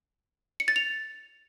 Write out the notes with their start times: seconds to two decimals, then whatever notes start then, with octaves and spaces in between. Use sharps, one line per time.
0.60 C#7
0.68 A6
0.76 F7